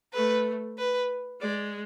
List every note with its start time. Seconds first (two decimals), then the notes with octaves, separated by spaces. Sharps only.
0.13 A3 B4
0.78 B4
1.41 G#3 D5